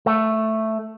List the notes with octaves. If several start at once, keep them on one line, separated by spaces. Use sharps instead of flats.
A3